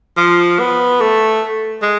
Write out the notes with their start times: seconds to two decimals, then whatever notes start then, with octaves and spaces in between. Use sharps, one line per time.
0.17 F3
0.59 B3
1.01 A3
1.82 G#3